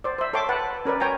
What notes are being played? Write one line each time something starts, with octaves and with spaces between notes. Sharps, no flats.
C5 D5
C5 E5
A4 C#5 E5 G5 C6 D6
B4 F#5 A5
C#4 A#4 B4 D5
C#5 G5 G#5 A#5